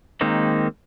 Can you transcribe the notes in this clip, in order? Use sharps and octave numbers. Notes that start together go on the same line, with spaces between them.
D#3 G#3 A#3 C4 D#4